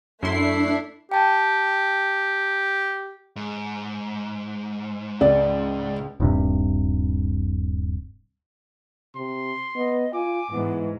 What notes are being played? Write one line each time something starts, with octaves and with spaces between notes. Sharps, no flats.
F#2 A3 D4 E4 C6 C7
G4 G5 A5
G#2
C#2 D5
D#1 G2 C3
C3 C6
B3 D#5
F4 G#5 D6
G#2 E3 B3